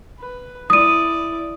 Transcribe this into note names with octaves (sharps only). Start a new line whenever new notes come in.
B4
E4 D5 D#6 D#7